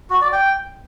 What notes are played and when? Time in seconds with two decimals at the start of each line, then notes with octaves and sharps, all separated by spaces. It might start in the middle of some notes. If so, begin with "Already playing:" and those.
0.10 F#4
0.21 D5
0.33 G5